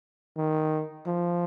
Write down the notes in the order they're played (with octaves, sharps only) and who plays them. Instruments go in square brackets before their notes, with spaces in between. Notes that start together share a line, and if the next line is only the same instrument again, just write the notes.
[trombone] D#3
F3